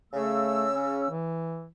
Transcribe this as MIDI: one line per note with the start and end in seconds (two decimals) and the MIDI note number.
0.13 1.10 49
0.13 0.68 57
0.13 1.10 88
0.74 1.08 61
1.10 1.67 52